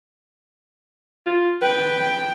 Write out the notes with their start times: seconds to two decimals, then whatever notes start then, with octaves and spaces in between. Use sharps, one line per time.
1.26 F4
1.62 B4 G5